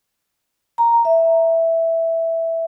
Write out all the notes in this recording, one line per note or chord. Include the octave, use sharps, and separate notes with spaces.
A#5
E5